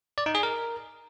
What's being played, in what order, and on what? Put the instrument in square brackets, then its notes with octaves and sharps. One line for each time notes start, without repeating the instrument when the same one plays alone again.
[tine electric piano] D5
D#4
G#4
A#4